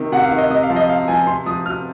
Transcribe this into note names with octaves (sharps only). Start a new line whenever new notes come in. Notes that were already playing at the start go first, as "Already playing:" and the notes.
Already playing: C3 D#3
C3 F#5
F5
D#3
D#5
C3 D#5
F5
F3
D#5
C3 F5
F3 G#5
C3 C6
F3 D#6
C3 F6